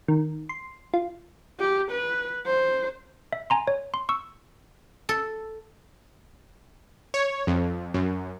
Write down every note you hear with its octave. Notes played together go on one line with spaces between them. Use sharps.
D#3
C6
F4
G4
B4
C5
E5
G#5 A#5 C6
C#5
C6
C#6 E6
A4
C#5
F2
F#2